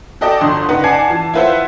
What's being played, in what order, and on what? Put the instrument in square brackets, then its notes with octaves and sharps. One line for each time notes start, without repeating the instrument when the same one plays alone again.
[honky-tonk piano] F#4 A4 D5 D#5 G5 A5
G1 D3 C6 D#6
C#3 D#4 B4 F#5
D5 F#5 G#5 A5 G#6 C7
E3 A5
E4 F4 B4 C5 E5 F#5